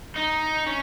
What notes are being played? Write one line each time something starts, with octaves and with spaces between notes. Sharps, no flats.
D#4
C#4